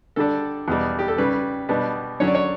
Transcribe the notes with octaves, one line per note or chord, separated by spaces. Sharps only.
D3 G3 D4 A4
E2 B2 G3
G4
A4
C#3 G3 C#4 B4
B2 G3 B3 D4
D3 F#3 C#4 C#5
D5
C#5